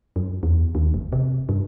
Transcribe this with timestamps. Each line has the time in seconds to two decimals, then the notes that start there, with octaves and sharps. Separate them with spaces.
0.16 F#2
0.43 E2
0.75 D#2
0.94 F#1
1.13 C3
1.49 G2